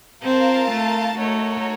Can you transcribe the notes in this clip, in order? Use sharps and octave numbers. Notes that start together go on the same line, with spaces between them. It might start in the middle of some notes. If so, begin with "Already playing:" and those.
C4 F4 A#4 F5 A5
A3
A3 D#4 F#4 A#4 C#5